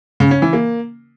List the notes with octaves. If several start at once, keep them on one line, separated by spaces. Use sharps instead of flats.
C#3
C#4
E3
A#3